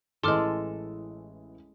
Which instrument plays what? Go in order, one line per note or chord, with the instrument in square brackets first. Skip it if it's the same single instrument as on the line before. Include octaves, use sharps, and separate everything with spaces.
[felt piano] A1 E3 [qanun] G#3 A4 [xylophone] C6 D6 F6